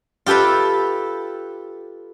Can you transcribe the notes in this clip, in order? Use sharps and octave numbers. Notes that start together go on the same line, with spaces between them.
F4 G4 A4 B4 E5